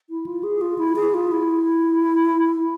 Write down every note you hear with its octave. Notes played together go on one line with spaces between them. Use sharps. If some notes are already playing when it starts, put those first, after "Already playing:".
E4
F4
G#4
F4
E4
G#4
F4
E4